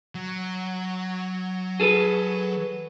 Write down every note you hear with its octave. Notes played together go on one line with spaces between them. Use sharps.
F#3
G#4 A4 B4